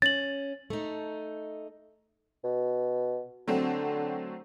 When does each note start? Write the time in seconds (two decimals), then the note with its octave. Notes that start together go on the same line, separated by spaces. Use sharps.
0.02 C#4 A6 F#7
0.70 A3 D#4
2.44 B2
3.48 D3 F#3 A3 C4